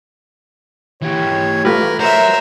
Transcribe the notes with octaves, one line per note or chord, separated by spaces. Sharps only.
E3 G4 C#5
A3 F4 G4 A#4 B4
F#4 A#4 C5 C#5 E5